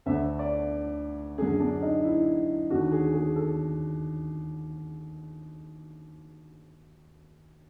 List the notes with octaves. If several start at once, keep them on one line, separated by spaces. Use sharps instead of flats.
D2 D3 E5
D5
F#2 D3 G#4
D4
D#4
E4
D#2 D3 F#4
G#4
G#4
A4